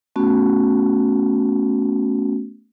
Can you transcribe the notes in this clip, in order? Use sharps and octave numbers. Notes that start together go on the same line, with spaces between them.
A3 B3 C#4 F#4